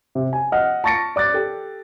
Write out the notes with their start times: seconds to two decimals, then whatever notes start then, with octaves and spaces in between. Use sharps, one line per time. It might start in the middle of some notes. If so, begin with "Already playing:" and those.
0.15 C3
0.33 G#5
0.52 D#5 F#5 F6
0.84 A5 C#6 A6 A#6 C#7 D7
1.16 D5 D6 F#6 A6
1.34 G4 A4